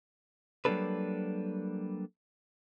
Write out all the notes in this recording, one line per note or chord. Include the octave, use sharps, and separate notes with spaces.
F#3 G3 A#3 D4 A4 B4